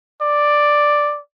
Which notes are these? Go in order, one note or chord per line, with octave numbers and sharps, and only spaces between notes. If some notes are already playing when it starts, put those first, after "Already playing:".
D5